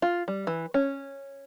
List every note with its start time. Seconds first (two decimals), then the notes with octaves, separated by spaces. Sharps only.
0.02 F4
0.28 G3
0.47 E3
0.74 C#4